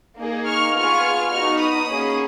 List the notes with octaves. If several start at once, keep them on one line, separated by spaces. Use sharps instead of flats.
A#3 D#4 G#4
C#6 F6
B3 F4 G#4 C#6 F6
B3 D#4 F#4 C#6 F6
B5 D#6
A#3 C#4 G#4